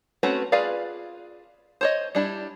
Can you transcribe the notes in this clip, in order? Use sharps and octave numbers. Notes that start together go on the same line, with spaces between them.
A3 C4 C#4 F#4 B4
F4 G#4 B4 D5 F5
C5 C#5 D#5
G3 D4 E4